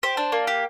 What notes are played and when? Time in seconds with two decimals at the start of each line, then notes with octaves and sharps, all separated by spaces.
0.03 G4 C5
0.17 D4
0.32 A#3
0.47 G4